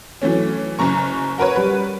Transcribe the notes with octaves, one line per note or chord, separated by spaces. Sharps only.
E3 F#3 A3 C#4
F#1 F#2 A#5 C#6
F#4 A#4 B4 C#5
G3 B4